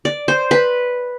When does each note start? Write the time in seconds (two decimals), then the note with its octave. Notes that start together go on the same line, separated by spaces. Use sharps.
0.05 D5
0.28 C5
0.51 B4